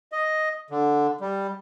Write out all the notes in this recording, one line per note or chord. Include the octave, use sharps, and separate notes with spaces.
D#5
D3
G3